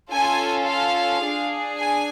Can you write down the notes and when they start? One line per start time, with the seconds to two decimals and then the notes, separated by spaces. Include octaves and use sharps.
0.10 C#4 F4 A4 G#5
0.66 F5
1.22 D4 G#4
1.78 G#5